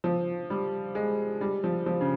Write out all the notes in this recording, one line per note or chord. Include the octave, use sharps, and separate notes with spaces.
F3
G3
G#3
G3
F3
F3
C#3